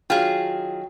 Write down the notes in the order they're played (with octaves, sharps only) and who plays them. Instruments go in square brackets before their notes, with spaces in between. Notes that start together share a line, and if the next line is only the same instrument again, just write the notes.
[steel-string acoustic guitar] D#3 F#3 [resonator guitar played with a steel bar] F4 G#4 [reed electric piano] G5